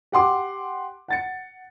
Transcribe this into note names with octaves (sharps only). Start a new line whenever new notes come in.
G4 F#5 C6 D6
F#5 A6 C#7